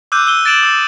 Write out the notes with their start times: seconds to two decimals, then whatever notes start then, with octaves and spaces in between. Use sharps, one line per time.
0.12 D6 E6 F#6 G6 D#7
0.27 E6 D#7 G7
0.45 A6 D7 E7 F#7
0.63 D#6 E6